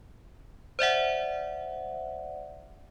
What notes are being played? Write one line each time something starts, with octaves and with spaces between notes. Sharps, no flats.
C5 D5 E5 F#5